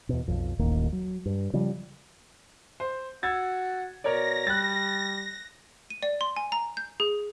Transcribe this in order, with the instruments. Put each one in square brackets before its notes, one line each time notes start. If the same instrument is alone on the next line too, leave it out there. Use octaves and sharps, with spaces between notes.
[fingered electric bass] E2 B2
B1 F2
D#1 A1 D#2 A#3
F#3
G2
C#3 F3 G3
[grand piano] C5
[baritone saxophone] F#4 [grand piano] E6 G#6 A6
[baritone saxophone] B2 [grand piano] A#4 C#5 D5 [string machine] A#6
[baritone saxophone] G3 [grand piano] F#6 A6
[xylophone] D#7
D5
C6
G#5
A#5
G6
G#4